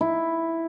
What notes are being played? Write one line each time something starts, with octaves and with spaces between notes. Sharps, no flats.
E4